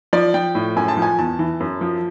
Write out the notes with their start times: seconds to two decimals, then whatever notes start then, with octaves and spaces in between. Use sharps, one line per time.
0.13 F3 D5
0.34 F3 G5
0.55 A2
0.76 F#2 G#5
0.88 A5
0.97 F3
1.02 G#5
1.19 E2 A5
1.39 E3
1.60 F#2
1.81 F3